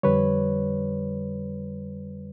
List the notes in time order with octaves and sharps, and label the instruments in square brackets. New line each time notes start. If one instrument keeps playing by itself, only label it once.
[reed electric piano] F2 D3 G3 B4 C#5